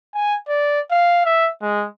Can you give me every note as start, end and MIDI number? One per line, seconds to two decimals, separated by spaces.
0.14 0.36 80
0.49 0.80 74
0.91 1.20 77
1.25 1.49 76
1.62 1.86 56